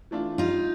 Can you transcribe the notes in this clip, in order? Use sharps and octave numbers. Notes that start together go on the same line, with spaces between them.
E3 A3 D4 F4
G3 D#4 F4